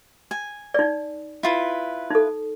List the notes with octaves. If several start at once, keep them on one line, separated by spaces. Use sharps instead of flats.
G#5
D#4 D5
E4 F4 B4
D#4 A4